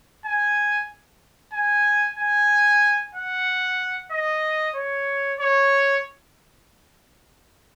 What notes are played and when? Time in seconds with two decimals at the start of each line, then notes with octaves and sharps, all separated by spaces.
0.25 G#5
1.53 G#5
2.18 G#5
3.15 F#5
4.11 D#5
4.75 C#5
5.40 C#5